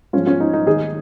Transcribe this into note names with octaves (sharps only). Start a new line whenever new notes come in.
G#2 F3 G#3 C#4 F4
C#4 F4
D#4
D#4
D#2 D#3 G#3 D#4 G#4